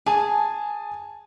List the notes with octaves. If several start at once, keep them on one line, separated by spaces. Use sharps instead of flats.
G#4 G#5 A5